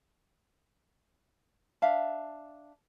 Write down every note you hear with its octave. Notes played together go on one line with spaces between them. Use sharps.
D4 E5 F5 A5